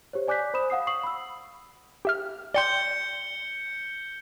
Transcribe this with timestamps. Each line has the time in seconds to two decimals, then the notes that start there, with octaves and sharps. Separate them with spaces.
0.13 G4 C5 C#5
0.28 D5 G#5 D6 F#6 G6 B6
0.54 C5 B5 D#6 E7
0.70 F5 F#5 D#6 C7
0.87 C#6 D#6 C7 F#7
1.03 B5 E6
2.05 G4 E5 F6
2.54 D5 G5 C6 G6 C#7 G7